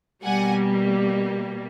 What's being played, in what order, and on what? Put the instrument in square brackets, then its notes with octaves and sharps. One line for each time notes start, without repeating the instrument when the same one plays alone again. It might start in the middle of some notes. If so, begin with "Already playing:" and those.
[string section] B2 G3 A#3 F#5 G#5